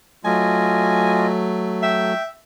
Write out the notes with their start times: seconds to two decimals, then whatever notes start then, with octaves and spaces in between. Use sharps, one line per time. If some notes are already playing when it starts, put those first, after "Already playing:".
0.25 F#3 A3 F4 D#5 G#5
1.83 E5 G5